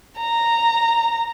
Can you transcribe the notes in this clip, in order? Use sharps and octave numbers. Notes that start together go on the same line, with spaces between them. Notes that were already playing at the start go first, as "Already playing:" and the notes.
A#5